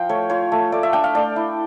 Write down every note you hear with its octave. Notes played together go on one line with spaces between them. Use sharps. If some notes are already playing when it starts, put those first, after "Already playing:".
Already playing: F3 F5 G5
A3 C#5
F4 C#5
A3
A3 D5
E5
D4 G5
F5
A3 D5
E4